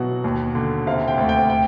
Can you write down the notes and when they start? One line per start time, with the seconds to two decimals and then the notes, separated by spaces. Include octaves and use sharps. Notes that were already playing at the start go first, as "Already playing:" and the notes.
Already playing: B2 E3 F#3 F#5
0.24 D#2
0.55 D3
0.87 C3 F5
1.08 G5
1.18 D2
1.29 G5
1.50 G5